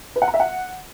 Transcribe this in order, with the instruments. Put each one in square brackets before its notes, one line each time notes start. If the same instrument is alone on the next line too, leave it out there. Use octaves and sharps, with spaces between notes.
[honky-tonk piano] B4
F#5
A#5
E5
F#5